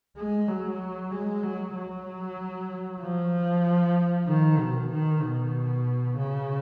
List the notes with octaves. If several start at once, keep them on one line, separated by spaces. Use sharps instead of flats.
G#3
F#3
G#3
F#3
F#3
F3
D#3
B2
D#3
B2
C#3